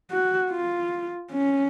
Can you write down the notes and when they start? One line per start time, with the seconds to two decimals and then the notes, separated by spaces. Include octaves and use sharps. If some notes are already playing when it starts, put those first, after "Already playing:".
0.11 F#4
0.51 F4
1.32 C#4